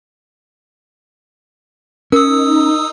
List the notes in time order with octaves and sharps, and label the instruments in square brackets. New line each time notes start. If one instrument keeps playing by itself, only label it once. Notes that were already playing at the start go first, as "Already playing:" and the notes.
[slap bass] C#4 [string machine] D#4 [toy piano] A#4 [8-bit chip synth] D#6 E6